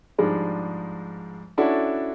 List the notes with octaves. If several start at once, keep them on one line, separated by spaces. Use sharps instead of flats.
G#2 F3 G3 G#3 D4
C#4 D4 E4 F#4 A4